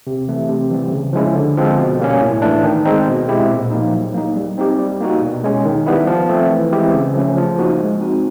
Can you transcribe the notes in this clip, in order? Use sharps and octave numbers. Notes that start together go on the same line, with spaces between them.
C3
E3 A3
C3
E3 G3 C4
C#3
F3 G#3 C#4 E4
D3
F3 G#3 C4
B2
G3 A#3 C#4
A2
E3 A3 D4
D#3
G#3 C4 D#4
B2
G#3 C4 E4 G4
A#2
F3 A#3 D#4
F#3
A#3 D#4
G3
C4 D#4 G4
G3
A#3 D#4 F#4
B2
G#3 C#4
D#3
G3 B3 E4
F3
A3 C4
E3
G#3 C4 E4 G4
C#3
F3 A3 C#4
F3
A#3 D#4 F#4
G#3
C4 D#4 F#4